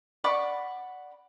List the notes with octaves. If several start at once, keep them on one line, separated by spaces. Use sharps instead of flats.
D5 F#5 B5 C#6